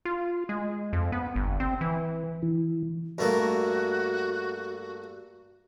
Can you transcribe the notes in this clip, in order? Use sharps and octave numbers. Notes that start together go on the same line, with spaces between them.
F4
G#3
F2
B3
G1
C4
E3
E3
G2 A3 A#3 F#4